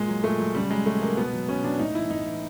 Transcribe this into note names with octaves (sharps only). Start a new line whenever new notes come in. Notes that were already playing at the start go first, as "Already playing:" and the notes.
Already playing: A#2 G#3
F#3
A#2 A3
F#3
C#3 G3
F#3 G#3
C#3 A3
F#3 A#3
B2 B3
F#3
B2 C#4
F#3 D4
A2 D#4
E3 E4
A2 D#4
E3